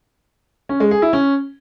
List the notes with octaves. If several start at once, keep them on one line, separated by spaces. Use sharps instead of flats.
C#4
G#3
G#4
E4
C#4